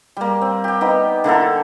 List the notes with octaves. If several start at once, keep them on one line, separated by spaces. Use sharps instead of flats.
G3 A#3
C4
G4 G5
B3 D#4 G4
D3 A#3 E4 A4